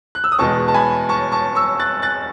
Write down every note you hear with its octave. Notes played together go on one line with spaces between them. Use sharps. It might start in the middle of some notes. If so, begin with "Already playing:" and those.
F#6
E6
D#6
E2 B2 G#3 A5 C#6
A5
G#5 B5
A5 C#6
A5 C#6
C#6 E6
F#6 A6
F#6 A6